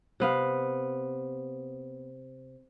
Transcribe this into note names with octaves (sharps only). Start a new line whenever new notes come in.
C3 B3 F5